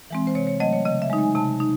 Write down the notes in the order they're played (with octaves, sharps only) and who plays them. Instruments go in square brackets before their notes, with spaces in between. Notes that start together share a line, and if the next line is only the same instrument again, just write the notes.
[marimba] E3 G#3 C4
C5
C3 C#5
C#5
F#3 A3 D#5
C#5
C#3 D#5
E5
G#3 D#4
G#5
C3 A5
D#4